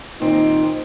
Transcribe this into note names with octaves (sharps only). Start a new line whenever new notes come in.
A#2 D#3 C4 D#4